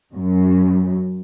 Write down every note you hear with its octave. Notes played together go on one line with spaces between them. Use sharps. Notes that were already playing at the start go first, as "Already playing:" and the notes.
F#2